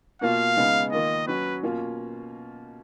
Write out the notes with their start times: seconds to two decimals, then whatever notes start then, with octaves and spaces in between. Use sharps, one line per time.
0.21 B2 A#3 F4 F5
0.57 C#3 G#3 B3 D#4
0.92 D#3 A#3 F4 D#5
1.28 F#3 C#4 F#4 B4
1.63 B2 A#3 C#4 F4